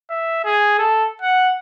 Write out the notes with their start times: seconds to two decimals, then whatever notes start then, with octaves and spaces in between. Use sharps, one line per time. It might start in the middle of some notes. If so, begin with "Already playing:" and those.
0.10 E5
0.45 G#4
0.79 A4
1.22 F#5